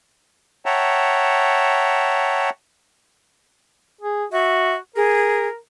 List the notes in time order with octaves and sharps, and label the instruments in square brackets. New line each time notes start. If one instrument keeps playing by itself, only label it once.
[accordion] C#5 E5 F#5 G5 A5 A#5
[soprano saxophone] G#4
[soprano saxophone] F#4 [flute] E5
[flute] G#4 [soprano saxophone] A#4